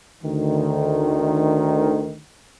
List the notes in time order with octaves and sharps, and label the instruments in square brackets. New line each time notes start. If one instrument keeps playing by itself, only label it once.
[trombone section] D2 D#3